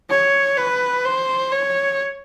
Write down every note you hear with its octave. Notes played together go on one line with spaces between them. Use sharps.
C#5
B4
C5
C#5